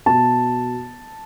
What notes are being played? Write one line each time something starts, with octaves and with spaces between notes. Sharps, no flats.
B2 A5